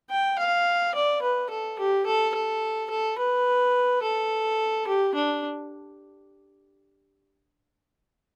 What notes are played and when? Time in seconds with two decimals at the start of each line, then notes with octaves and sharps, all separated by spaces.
0.10 G5
0.39 F5
0.95 D5
1.22 B4
1.50 A4
1.79 G4
2.06 A4
2.35 A4
2.90 A4
3.18 B4
4.02 A4
4.87 G4
5.15 D4